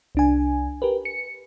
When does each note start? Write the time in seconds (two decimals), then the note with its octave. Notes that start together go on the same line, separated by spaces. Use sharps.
0.15 C2 D4 G#5
0.82 G4 A#4 B4
1.05 C#7